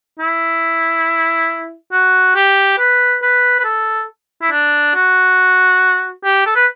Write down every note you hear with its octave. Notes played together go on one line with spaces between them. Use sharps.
E4
F#4
G4
B4
B4
B4
A4
E4
D4
F#4
G4
A4
B4